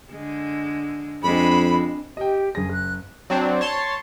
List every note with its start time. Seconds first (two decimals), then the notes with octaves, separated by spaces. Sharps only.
0.11 D3 G#3
1.23 F2 G#3 C4 D4 B5
2.17 G4 D#5 G5
2.55 F#1 G#4 A#6
2.72 F#6
3.30 F#3 C4 D4
3.61 C#5 A5 C6